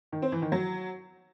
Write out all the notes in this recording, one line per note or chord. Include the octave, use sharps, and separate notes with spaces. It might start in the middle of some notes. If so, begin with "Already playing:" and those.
D#3
C4
E3
D#3
F#3